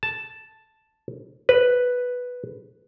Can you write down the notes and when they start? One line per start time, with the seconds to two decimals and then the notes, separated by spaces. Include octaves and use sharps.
0.03 A5
1.49 B4